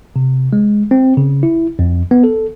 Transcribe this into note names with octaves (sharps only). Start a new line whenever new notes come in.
C3
G#3
C4
C#3
E4
F2
B3
A4